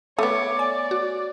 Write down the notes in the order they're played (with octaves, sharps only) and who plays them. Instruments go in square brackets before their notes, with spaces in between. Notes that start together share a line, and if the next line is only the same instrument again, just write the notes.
[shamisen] A3 B3 [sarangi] C#5 [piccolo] D6
[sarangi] D5 [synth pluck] G#5
[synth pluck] F#4